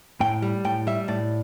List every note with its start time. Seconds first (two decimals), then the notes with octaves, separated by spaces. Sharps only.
0.20 A2 G5
0.42 G3
0.65 A2 G5
0.87 G3 E5
1.08 A2 D5